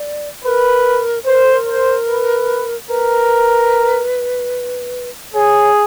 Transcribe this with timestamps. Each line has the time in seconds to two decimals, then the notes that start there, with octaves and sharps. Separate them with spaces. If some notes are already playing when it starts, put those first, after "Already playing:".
Already playing: D5
0.45 A#4 B4
1.26 B4 C5
1.35 A#4
1.44 A4
1.52 A#4
1.67 C5
2.08 B4
2.89 A#4 B4
5.34 G#4 C#5